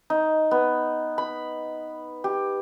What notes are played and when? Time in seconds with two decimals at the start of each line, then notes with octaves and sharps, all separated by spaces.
0.10 D#4
0.51 B3
1.18 B5
2.24 G4